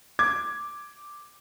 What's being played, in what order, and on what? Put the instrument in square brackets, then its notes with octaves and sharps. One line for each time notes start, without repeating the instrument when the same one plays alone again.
[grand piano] D6 G#6